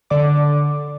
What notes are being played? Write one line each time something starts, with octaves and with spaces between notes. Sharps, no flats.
D3 D5 D6